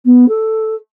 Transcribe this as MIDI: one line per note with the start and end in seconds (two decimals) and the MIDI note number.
0.05 0.28 59
0.28 0.75 69